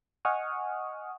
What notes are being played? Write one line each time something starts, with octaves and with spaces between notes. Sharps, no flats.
D#5 F#5 G#5 C#6 D#6 F6